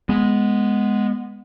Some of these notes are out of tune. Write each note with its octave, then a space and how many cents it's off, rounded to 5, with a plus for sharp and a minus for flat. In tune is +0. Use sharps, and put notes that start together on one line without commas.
G#3 +0 B3 +0